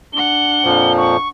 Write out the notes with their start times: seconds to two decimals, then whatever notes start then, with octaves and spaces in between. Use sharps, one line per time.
0.13 D4 F#5 G7
0.64 F2 A#2 F3
0.98 C#6